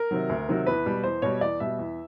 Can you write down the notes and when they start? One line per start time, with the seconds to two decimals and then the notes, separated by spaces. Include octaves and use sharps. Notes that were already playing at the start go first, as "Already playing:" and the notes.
Already playing: A#4
0.11 C3 D#3 F#3
0.29 D2
0.49 C3 D#3 F#3
0.66 E2 B4
0.86 B2 G3
1.03 E2 C5
1.22 B2 G3 C#5
1.41 E2 D5
1.60 B2 G3 E5
1.79 E2